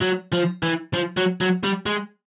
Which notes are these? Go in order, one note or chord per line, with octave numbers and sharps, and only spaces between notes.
F#3
F3
E3
F3
F#3
F#3
G3
G#3